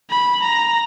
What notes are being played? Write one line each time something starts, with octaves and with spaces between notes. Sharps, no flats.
B5
A#5